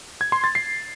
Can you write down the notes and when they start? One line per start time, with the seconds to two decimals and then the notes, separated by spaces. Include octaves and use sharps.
0.21 G#6
0.32 C6
0.44 A6
0.55 C7